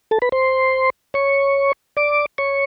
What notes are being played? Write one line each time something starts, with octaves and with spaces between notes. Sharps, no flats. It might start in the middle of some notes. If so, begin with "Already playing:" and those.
A4 A5
B4 B5
C5 C6
C#5 C#6
D5 D6
C#5 C#6